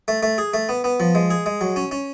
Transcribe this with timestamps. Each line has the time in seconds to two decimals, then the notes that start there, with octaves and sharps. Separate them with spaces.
0.08 A3
0.23 A3
0.38 G#4
0.54 A3
0.69 B3
0.84 B3
1.00 F3
1.15 G#3
1.30 G#4
1.46 G#3
1.61 F#3
1.76 C#4
1.91 C#4